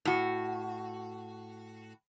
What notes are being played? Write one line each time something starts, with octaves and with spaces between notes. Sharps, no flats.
A2 F#4